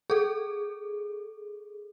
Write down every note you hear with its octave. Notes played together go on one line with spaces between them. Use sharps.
G#4 A4